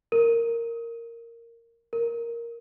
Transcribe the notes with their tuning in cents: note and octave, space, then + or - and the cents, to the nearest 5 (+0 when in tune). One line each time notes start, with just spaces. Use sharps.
A#4 -10
A#4 +0